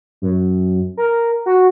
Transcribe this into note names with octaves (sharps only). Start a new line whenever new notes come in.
F#2
A#4
F#4